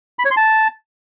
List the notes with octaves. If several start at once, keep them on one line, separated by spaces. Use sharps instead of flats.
B5
C#5
C6
A5